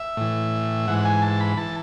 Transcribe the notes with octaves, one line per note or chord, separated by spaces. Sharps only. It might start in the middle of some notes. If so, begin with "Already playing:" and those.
Already playing: E5
A2 E3
G#2 E3 F#5
G#5
A5
B5
E3 A5